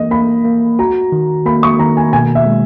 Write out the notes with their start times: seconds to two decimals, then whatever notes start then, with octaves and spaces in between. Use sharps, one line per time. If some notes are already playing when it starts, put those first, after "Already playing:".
Already playing: E3 A#3 D#5
0.11 A#3 B5
0.45 A#3
0.79 F#4 A#5
1.12 D#3
1.46 A#3 B5
1.63 C#6
1.79 D#3 A#5
1.97 G#5
2.13 B2 G#5
2.35 E5
2.46 G#3